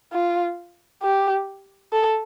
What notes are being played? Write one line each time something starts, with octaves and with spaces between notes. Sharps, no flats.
F4
G4
A4